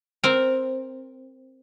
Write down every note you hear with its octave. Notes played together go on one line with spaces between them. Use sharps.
C4 A#4